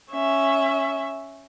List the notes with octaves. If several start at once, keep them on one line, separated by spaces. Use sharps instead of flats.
C#4 E5